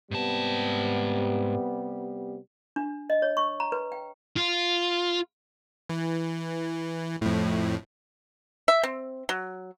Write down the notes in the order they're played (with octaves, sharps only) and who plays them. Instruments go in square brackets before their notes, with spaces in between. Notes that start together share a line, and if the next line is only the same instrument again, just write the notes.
[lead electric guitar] G#2 A5 [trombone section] C3 G3 B3
[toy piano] D4
D#5
C#5
C#6
A#5
B4
G5
[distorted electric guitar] F4
[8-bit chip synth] E3
F2 A2
[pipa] E5
C4
F#3